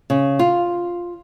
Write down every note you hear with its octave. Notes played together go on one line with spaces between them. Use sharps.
C#3
F4